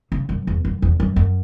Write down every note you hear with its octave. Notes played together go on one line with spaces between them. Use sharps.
C#3
F#2
E2
F#2
E2
F#2
F#2